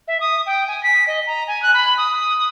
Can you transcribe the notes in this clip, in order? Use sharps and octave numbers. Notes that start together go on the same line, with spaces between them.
E5
D#6
G5
G#5
B6
D#5
A#5
G#5
F#6
B5
D#6